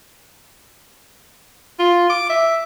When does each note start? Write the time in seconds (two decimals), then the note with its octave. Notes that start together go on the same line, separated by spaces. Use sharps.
1.79 F4
2.10 D6
2.30 E5